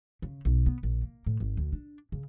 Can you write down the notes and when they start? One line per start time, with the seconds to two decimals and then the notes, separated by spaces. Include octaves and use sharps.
0.22 C#3
0.45 B1
0.66 B3
0.83 A#1
1.03 A#3
1.26 A2
1.40 G#1
1.57 D2
1.73 D4
2.12 C#3